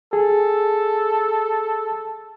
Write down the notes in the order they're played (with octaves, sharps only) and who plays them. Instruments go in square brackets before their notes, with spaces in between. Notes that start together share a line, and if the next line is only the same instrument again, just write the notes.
[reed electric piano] G#4 [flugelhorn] A4